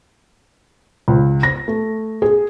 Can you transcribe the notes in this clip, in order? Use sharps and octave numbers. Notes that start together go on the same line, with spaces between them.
C#2
A#6
A3
G#4